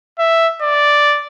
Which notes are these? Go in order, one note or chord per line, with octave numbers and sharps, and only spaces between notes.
E5
D5